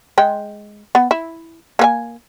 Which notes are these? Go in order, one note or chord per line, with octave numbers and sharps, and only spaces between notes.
G#3 G5
B3
E4
A#3 B4 G#5